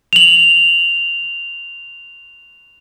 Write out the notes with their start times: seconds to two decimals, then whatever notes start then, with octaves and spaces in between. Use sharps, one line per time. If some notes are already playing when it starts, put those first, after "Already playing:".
0.13 F7 F#7